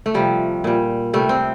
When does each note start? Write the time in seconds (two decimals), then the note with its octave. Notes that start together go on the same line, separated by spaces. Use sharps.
0.06 A3
0.14 C3 F3 G3
0.64 A#2 G3
1.13 C3 G3 A3
1.29 C4